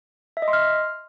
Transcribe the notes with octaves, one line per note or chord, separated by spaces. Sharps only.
E5
D#5
C6
F6